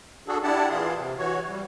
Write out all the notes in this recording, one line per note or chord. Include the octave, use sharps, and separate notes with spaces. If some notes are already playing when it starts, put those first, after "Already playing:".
D4 F#4 G#4 A4
D4 E4 G4 D5 F#5 A5
A#2 E3 E4 G#4 F5 C6
C3
E3 F#4 C#5
G3